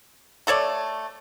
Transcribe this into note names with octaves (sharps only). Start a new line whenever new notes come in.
A3 A4 C#5 D5